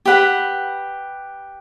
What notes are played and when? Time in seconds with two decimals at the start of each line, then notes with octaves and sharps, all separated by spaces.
0.05 G4 B4 F#5 B5